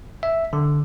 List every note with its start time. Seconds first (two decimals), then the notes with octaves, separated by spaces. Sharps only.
0.23 E5
0.53 D3